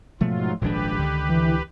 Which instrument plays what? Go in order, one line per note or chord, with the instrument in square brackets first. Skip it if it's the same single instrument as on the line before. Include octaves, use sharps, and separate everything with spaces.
[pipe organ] G#2 F#3 F4 [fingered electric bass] B2 G#3 [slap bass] F3 A3
[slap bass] D#1 G#1 D4 [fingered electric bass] A#2 F3 G#3 [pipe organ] G4 B4
[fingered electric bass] C#2 [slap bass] D3 D#3
[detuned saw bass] E3